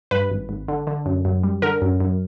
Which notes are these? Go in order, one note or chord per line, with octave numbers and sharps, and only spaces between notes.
G2 B4
G#1
G#1
D3
D3
F#2
F#2
G3
D3 A#4
F#2
F#2